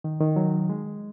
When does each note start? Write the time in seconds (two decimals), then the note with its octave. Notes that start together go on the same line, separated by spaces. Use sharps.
0.04 D#3
0.20 D#3
0.36 F#3
0.70 G#3